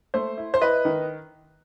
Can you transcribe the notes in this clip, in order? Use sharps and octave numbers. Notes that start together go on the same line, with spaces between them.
A3 C5
E4
C5
E4 B4 D#5
D#3